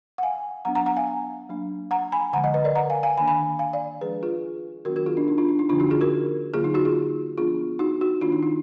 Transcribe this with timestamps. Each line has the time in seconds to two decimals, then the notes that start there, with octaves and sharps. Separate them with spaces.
0.18 F#5
0.23 F5 G#5
0.65 F#3 B3 D4 F#5 A#5
0.75 F#5 A#5
0.86 F#5 A#5
0.97 F5 G#5
1.49 F#3 A#3 D4
1.91 F#5 A#5
2.12 G#5 B5
2.33 D3 F3 G#3 F#5 A#5
2.44 D#5 F#5
2.54 B4 D#5
2.64 A#4 D5
2.75 F#5 A#5
2.90 F5 G#5
3.03 F5 G#5
3.17 D#3 A#3 D4 G#5 B5
3.27 G#5 B5
3.59 F5 G#5
3.73 D5 F5
4.01 F3 G#3 D4 G#4 B4
4.23 F4 G#4
4.85 D#3 F#3 B3 D4 F#4 A#4
4.96 F#4 A#4
5.06 F4 G#4
5.17 D4
5.28 D#4
5.38 D4 F4
5.48 D4
5.59 D#4
5.69 D3 F3 A#3 D4 F4
5.80 D#4 F#4
5.90 F4 G#4
6.01 F#4 A#4
6.54 D3 F#3 A#3 F4 G#4
6.64 D#4
6.74 D#4 F#4
6.85 F4 G#4
7.38 F3 B3 D4 F4 G#4
7.79 D#4 F#4
8.01 D#4 F#4
8.21 D#3 A#3 D4 F4
8.32 D#4
8.43 D#4